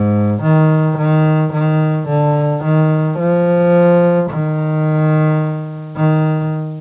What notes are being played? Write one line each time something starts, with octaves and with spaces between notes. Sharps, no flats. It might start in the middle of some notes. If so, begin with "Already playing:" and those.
Already playing: G#2
D#3
D#3
D#3
D3
D#3
F3
D#3
D#3